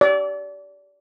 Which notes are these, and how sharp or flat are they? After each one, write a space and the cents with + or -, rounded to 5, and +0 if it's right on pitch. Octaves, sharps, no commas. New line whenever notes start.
D5 -25